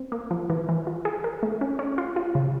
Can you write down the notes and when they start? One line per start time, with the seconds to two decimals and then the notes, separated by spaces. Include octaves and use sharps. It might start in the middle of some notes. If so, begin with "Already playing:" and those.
Already playing: C4
0.12 A#3
0.31 F3
0.50 E3
0.69 E3
0.87 F4
1.05 G#4
1.24 A#4
1.43 A3
1.61 C#4
1.79 C#4
1.98 F4
2.16 F4
2.35 C#3